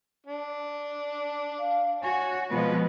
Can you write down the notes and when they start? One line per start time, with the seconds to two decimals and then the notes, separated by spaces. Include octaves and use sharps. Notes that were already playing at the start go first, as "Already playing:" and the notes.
0.26 D4
1.60 F5
2.03 F#4 C#5 G#5
2.51 B2 F3 G#3 F4 B4